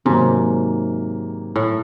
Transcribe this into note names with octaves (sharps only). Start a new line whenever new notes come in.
G#2 C3 D#3 F#3 A#3
A2